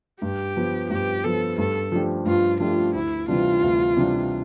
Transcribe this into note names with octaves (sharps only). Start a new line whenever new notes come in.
G2 G4
F3 B3
G2 G4
F3 B3 A4
G2 A4
F3 A3 D4 G4
G2 F4
F3 A3 D4 F4 G4
D2 E4
C3 E3 G3 D4 F4
D2
C3 E3 G3 D4